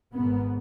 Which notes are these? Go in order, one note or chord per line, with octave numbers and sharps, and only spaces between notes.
G#1 G#2 B3